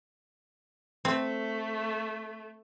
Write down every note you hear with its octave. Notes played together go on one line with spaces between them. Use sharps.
A3 C4